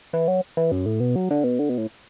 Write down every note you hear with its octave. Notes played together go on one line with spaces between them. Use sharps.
E3
F#3
E3
F#2
A2
B2
F#3
D3
B2
D3
B2
A2